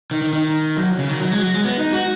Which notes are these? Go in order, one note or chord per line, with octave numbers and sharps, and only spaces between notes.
D#3
D#3
D#3
F#3
C#3
D#3
F#3
G#3
F#3
G#3
B3
D#4
F#4